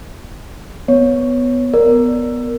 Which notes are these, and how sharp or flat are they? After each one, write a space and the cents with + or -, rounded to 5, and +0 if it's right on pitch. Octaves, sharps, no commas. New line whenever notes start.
B3 +10 C#5 +0
B3 +0 A#4 +0 D5 +5